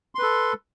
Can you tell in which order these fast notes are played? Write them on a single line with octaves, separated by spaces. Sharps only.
C6 B4 A4